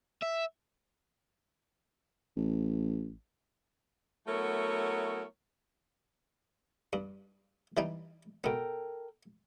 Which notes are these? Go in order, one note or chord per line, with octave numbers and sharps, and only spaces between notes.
E5
A1
F#3 A3 B3 E4 A#4 C#5
G2
E3 G3 D#4
B2 B3 A4 A#4 G5